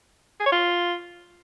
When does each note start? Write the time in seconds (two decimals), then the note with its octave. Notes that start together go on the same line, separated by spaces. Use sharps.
0.40 G#4
0.46 C#5
0.52 F4